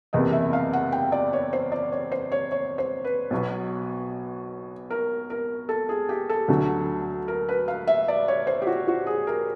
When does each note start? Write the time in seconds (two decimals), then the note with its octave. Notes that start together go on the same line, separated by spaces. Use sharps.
0.13 F#1 E2 C3 D#5
0.32 E5
0.53 F5
0.73 F#5
0.92 G5
1.12 D5
1.33 C#5
1.53 C5
1.72 D5
1.92 C#5
2.12 C5
2.32 C#5
2.52 C#5
2.78 C5
3.04 B4
3.30 B1 B2 F#3
4.90 A#4
5.30 A#4
5.69 A4
5.89 G#4
6.09 G4
6.29 A4
6.48 D2 D3 F#3
7.28 A#4
7.49 B4
7.68 F5
7.87 E5
8.08 D5
8.28 C#5
8.47 C5
8.62 G4
8.67 F#4
8.88 F#4
9.07 G#4
9.27 A#4